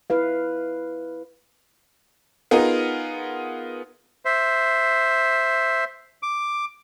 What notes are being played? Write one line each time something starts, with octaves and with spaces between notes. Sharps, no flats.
E4 B4 F5
B3 D#4 F4 G#4 A#4
C5 E5
D6